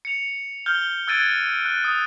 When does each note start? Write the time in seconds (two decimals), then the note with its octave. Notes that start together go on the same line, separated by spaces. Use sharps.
0.05 C#7 F7
0.66 F6 G6 G7
1.08 E6 F#6 G#6 A6 D7 D#7
1.65 F#6
1.84 D#6